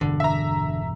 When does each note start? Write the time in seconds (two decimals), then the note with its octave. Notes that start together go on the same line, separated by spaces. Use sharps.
0.01 E1 G2 D3
0.20 E5 A#5